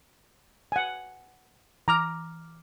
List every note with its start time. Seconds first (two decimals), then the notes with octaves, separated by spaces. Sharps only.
0.72 F#5 G#5
1.88 E3 A#5 D6 F6